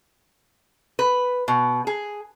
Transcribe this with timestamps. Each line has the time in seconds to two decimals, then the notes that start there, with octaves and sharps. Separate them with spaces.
0.99 B4
1.48 B2
1.87 G#4